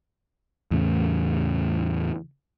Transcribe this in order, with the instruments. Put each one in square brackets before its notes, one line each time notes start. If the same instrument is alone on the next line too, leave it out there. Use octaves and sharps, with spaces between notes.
[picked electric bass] E2 A2 C#3